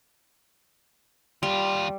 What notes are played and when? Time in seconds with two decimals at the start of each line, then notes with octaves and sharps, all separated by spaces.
1.43 D#2 G3 F4